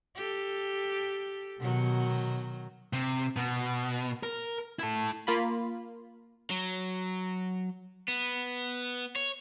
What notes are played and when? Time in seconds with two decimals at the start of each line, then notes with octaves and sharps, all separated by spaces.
0.16 G4 A4
1.61 B2 D#3 F#3
2.93 C3
3.36 B2
4.23 A#4
4.79 E4 A4
5.27 A#3 F4 B5
6.50 F#3
8.08 B3
9.16 C#5